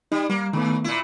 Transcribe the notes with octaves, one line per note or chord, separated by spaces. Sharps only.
G3 D#4
G3 A#3
G#2 D#3 A3 B3
A#2 E4